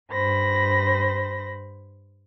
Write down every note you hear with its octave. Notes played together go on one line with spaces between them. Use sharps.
G2 C5 B5 A#6